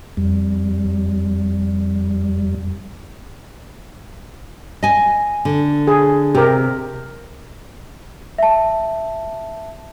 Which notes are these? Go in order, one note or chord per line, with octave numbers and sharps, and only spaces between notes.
F2 G3
D#5 G#5
D3
G#4
C3 G4 A#4
E5 A5